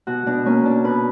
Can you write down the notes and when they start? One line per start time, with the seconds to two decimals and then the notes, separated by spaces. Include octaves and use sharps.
0.07 B2 F#4
0.26 B2 D4
0.46 A#3 C#4
0.65 B2 D4
0.84 B2 B4